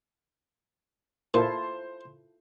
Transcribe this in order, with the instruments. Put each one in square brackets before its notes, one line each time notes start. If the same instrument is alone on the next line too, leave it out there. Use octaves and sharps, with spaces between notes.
[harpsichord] A#2 [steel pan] E4 F4 A4 [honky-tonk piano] C5